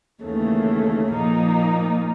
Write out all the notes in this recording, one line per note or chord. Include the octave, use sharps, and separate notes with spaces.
D#2 C#3 E3 A3
A#2 F3 A#3 D#4